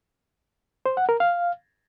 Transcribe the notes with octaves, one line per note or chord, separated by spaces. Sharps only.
C5
F#5
A#4
F5